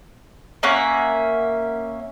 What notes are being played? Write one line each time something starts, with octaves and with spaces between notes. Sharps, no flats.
A#3 C#4 E5 F#5